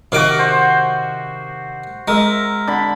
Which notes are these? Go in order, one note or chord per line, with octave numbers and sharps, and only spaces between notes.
C3 D#3 F#4 F5 D6
C5 F#5
G#3 A#4 E5
D3 B5